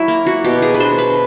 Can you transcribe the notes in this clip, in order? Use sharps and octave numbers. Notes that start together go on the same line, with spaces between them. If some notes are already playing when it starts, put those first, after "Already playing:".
Already playing: F#3 E4
A#3
F#4
B2 G4
G#4
B4
D4 C5
B4